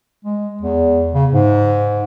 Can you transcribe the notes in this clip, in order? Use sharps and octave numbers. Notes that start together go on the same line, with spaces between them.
G#3
E2
C#3
G#2